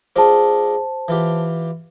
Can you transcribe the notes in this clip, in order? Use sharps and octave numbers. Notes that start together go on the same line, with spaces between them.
G#3 D4 F4 C5 A5
E3 F4 G4